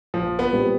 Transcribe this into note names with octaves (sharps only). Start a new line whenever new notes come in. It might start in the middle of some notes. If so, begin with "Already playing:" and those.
A#1 F3
B3
A#2 G3 C4